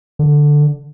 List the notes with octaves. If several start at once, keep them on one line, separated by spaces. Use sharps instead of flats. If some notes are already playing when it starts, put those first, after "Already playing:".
D3